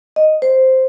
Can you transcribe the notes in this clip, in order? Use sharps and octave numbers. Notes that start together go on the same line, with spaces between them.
D#5
C5